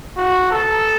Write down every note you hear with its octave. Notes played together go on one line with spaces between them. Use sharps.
F#4
A4